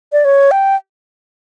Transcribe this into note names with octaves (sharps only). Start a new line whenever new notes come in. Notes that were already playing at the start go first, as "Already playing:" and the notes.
D5
C#5
G5